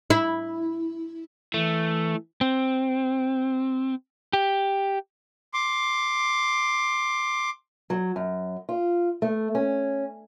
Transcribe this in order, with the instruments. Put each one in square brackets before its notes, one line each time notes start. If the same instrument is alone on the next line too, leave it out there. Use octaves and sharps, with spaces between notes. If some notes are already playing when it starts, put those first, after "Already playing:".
[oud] E4
[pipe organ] E3 [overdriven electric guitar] A3
[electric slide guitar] C4
G4
[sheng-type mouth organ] C6 D6
[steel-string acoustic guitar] F#3
F#2
F4
A3
C#4